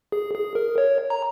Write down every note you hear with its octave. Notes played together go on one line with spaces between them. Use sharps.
G#4
G#4
A#4
C#5
A#5